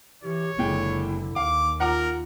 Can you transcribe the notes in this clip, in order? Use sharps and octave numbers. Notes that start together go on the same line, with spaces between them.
E3 G4 C#5
F#1 A#2 D3 G#3 E4 G5
D#2 F5 D6
F4 A#4 F#5 A#5 D6